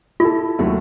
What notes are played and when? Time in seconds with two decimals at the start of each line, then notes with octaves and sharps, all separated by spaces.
0.20 E4 F4 A4
0.59 D#2 F#3 A3